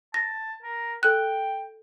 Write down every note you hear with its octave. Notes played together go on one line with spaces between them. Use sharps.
A5 A#6
A#4
A4 G5 F#6